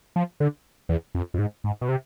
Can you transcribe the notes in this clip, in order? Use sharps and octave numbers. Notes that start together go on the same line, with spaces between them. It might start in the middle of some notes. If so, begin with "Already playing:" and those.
F3
D3
E2
F2
F2
G#2
G#2
B2
C3